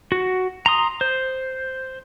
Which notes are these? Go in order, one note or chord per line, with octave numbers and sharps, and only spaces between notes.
F#4
A#5 C6 D#6
C5